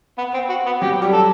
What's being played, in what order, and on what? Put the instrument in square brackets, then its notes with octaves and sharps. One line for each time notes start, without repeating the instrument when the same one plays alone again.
[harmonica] B3
C4
F#4
B3
[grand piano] F#3 [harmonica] G4
[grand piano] G3
[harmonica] A4